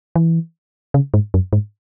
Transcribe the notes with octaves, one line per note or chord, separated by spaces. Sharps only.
E3
C#3
G#2
F#2
G#2